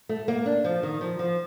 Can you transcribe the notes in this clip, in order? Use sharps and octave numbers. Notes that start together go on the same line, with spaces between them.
A3
A#3
D4
F3
D#3
F3
F3